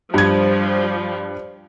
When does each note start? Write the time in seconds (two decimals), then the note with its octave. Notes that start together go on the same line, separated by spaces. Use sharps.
0.14 G2 F3 G3 G#6